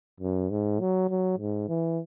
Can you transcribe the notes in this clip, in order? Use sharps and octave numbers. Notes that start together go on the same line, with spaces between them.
F#2
G#2
F#3
F#3
G#2
E3